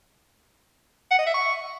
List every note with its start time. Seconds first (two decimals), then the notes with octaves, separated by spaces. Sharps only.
1.11 F#5
1.19 D#5
1.26 E5
1.34 C#6